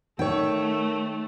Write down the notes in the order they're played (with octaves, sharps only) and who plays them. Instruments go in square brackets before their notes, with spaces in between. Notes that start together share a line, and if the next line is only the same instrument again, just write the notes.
[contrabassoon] D#3 [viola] A3 [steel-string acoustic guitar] C#5 G5